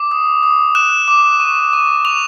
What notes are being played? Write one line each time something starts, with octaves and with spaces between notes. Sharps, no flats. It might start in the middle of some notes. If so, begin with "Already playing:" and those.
Already playing: D6
D#6
D#6
F#6 E7
D6
C#6
C#6
C#6 F7